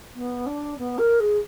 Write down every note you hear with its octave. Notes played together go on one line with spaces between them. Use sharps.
B3
D4
B3
A#4
G#4